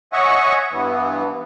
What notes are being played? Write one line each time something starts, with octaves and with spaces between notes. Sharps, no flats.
C#5 D#5 E5 F#5 G#5 C#6
G2 E3 B3